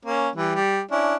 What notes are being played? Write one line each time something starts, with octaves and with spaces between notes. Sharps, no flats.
A#3 C#4
E3 G3
G3
C#4 D4 E4